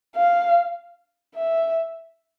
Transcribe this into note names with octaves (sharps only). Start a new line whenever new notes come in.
F5
E5